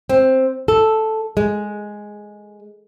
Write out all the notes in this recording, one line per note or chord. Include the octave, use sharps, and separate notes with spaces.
C4
A4
G#3